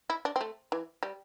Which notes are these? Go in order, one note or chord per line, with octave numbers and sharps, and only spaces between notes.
E4
D4
C4
A3
E3
G3